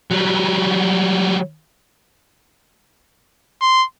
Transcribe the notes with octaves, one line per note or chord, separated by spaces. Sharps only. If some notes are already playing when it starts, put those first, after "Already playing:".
F#3 G3
C6